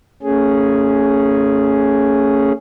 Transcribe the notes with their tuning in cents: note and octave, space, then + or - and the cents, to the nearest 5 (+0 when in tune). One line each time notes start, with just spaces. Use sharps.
A3 +35 C#4 +0 G#4 +0